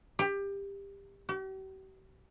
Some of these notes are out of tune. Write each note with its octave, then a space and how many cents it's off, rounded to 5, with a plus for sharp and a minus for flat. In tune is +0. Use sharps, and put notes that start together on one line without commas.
G4 +20
G4 -45